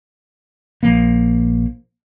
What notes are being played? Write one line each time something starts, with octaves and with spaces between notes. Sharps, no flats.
A#1 F3 A#3